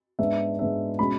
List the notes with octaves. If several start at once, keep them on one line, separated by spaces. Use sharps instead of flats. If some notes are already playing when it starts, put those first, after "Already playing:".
G#2 G#3 B3 D4 E5
G#2 G#3 B3 D4 E5
B2 G#3 C#4 B5